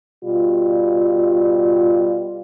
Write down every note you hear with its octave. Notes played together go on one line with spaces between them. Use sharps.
B2 G3 F4